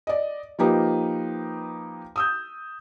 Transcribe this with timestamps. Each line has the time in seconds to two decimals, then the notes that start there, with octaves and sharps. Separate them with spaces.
0.07 D5 D#5
0.59 F3 A#3 D#4 G4 B4
2.16 D#6 E6 G6